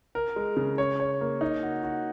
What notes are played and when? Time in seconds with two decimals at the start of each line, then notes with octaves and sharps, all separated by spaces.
0.15 A#4
0.36 G#3
0.57 C#3
0.78 C#5
1.00 C#5
1.21 A#3
1.41 D#4
1.63 F#4
1.84 F#4